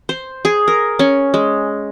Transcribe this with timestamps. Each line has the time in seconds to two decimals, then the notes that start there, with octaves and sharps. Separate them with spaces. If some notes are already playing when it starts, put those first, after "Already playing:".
0.09 C5
0.45 G#4
0.68 A#4
0.99 C#4
1.34 G#3